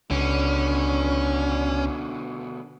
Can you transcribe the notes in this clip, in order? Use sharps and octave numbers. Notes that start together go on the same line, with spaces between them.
C#2 B2 D3 C#4 D4